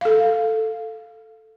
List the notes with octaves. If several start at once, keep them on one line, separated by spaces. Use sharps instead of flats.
A4 F5